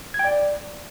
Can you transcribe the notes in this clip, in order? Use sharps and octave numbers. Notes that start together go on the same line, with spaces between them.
G#6
G5
D5